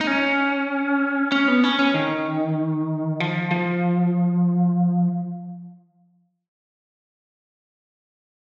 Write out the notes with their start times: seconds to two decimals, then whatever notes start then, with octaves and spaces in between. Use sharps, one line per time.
0.01 D#4
0.07 C#4
1.32 C#4
1.48 B3
1.64 C#4
1.79 C#4
1.94 D#3
3.20 F3
3.51 F3